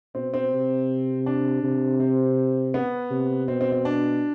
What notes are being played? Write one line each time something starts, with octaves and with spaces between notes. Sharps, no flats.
B2 C4
C4
C3
D4
C3
C4
B3
C3
B2 C4
C4
C4
D4